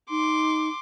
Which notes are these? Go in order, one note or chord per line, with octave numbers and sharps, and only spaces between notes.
D#4 C6 D6